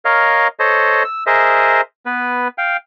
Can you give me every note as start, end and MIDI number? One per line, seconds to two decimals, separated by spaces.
0.05 0.48 70
0.05 0.48 73
0.05 0.48 75
0.05 0.48 77
0.59 1.03 69
0.59 1.03 72
0.59 1.03 73
0.59 1.03 75
1.05 1.24 88
1.26 1.81 68
1.26 1.81 70
1.26 1.81 72
1.26 1.81 75
1.26 1.81 76
2.06 2.48 59
2.06 2.48 71
2.58 2.77 77
2.58 2.77 79